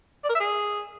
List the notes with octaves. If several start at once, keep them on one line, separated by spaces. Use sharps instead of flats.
D5
A#4
E5
G#4